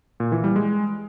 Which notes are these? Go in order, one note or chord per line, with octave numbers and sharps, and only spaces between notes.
A#2
E3
G3
G#3